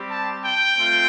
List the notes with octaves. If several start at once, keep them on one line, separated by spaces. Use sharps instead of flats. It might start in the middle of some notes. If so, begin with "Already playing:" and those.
Already playing: G3 C4 G4
A5
G5
A3 C4 F4